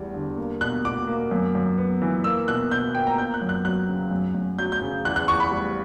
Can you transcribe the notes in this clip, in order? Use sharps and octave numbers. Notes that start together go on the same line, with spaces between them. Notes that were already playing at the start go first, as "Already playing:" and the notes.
Already playing: E2 G3 B3
D3
A#3
B2 F#6
B2 D6
A#3
F#2
F#2
B3
E3
A#3 E6
B2 F#6
B2 G6
A#3 G5
A#5
A#3 G6
F#6
F#2
F#6
F#3 F#6
C#3
F#2
F#2
F#3 G6
G6
C#3
E2 F#6
F#6
E2 C#6
B5
G3